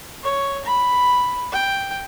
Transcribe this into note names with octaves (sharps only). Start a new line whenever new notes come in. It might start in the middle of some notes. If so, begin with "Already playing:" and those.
C#5
B5
G5